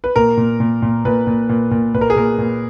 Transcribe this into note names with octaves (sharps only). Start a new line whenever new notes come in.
B4
A#2 A#4
A#2
A#2
A#2
A#2 B4
A#2
A#2
A#2
A#2 B4
A#4
G#4
A#2 A#4
A#2